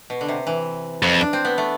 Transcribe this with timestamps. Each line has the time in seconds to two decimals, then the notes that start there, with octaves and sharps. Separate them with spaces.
0.10 B2
0.21 D3
0.28 C3
0.47 E3
1.02 F2
1.21 D4
1.33 C4
1.45 B3
1.58 A3